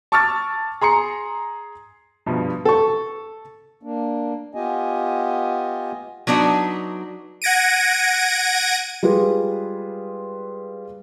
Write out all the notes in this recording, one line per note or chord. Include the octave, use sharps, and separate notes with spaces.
A5 C#6 D6 E6 F6 A6
G#4 A#5 C6 C#7
G2 B2 F3
A4 C#6
A#3 D4
B3 F4 G4 D#5 G#5
F#3 B3 D4 D#4 F#4
F#5 G#6 A#6 D7 D#7
G3 G#3 F4 G#4 B4